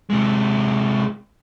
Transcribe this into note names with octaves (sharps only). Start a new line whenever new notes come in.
C3 G#3